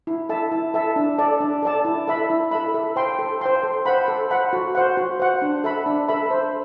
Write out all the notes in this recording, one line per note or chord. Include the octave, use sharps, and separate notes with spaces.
E4
A4 E5 A5
E4
A4 E5 A5
D4
A4 D5 A5
D4
A4 D5 A5
E4
A4 E5 B5
E4
A4 E5 B5
A4
C5 G5 C6
A4
C5 G5 C6
A4
C5 F#5 B5
A4
C5 F#5 B5
F#4
C5 F#5
F#4
C5 F#5
D4
A4 E5 B5
D4
A4 E5 B5
C5